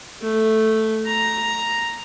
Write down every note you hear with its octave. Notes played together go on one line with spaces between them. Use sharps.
A3
A#5